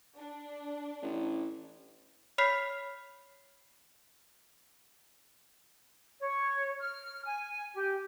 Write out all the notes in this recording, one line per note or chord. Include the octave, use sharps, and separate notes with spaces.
D4
A1
C#5 B5 F6 B6 C7 F7
C#5
F6
G#5
G4